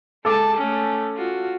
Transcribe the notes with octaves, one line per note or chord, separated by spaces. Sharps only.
G#3 A4 A5 D6
A3 C#4
F4 F#4